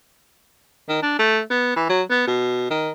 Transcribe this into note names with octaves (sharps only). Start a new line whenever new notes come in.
D#3
D4
A3
B3
E3
F#3
B3
B2
D#3